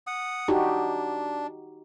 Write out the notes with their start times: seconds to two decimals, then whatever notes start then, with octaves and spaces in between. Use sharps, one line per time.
0.07 F#5 D#6
0.48 D4 D#4 F#4 G4